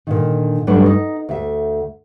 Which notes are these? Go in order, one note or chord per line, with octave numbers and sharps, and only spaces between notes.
A#2 D3 D#3
G2 F#3 A3 D4 B4 C#5
D#4
D2 E5